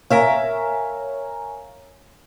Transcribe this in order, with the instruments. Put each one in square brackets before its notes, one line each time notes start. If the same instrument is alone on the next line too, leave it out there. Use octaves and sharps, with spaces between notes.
[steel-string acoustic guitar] A#4 E5 F5 [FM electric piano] C#5 G#5 A#5